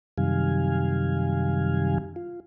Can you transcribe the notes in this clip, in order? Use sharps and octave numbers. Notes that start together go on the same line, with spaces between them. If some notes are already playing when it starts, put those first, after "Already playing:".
F#2 C3 D#3 G3 F5 G#5
F4